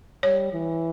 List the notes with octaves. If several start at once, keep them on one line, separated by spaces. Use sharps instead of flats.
G3 C#5
E3